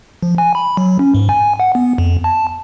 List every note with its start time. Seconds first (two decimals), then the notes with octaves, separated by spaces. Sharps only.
0.23 F3
0.38 G#5
0.55 B5
0.77 F#3
0.99 C#4
1.14 G#2
1.29 G#5
1.60 F#5
1.75 B3
1.98 F2
2.24 A5